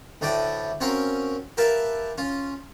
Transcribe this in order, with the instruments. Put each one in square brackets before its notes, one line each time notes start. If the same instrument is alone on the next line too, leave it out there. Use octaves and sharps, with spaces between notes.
[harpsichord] D2 A2 D4 E4 D5 G5
C4 C#4 F#4 A#4 C#5 F5
G4 A#4 B4 E5 F5 A5
C#4 F4